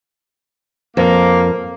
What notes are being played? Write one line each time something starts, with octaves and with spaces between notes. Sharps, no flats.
F2 A#3